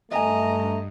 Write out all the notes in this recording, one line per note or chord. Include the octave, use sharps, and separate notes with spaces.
G2 A3 D#5 E5 G#5 A#5